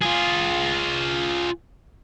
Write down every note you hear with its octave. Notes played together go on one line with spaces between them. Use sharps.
F4 G#4